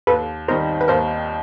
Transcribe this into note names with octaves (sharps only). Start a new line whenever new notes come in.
D#2 A4 B4
D#3 G3 C4 D#4 A#4 C5
B4
D#2 A#4 C5